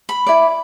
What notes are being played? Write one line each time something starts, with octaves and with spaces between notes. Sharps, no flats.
B5
E4 D5